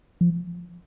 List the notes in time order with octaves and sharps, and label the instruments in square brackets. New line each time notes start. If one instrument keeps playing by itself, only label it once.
[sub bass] F3